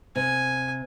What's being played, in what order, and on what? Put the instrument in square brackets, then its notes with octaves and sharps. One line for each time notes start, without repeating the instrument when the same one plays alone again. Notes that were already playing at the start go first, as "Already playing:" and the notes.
[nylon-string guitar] C3 [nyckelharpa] G#5